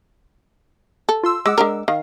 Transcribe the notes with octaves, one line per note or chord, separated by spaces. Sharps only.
A4
F4 C6 E6
G#3 F#5 D6 E6
G#3 D4 A#4
D#3 F5